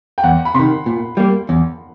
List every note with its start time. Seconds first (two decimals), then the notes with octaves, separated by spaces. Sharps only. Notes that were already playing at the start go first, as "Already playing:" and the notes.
0.18 G5
0.24 E2 F#5
0.45 B5
0.54 C3 D#3 C6
0.86 A#2
1.17 G3 A#3
1.49 E2